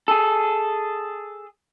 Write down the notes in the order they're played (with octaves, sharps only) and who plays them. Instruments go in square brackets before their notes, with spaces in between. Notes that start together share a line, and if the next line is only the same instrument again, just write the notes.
[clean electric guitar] G#4 A4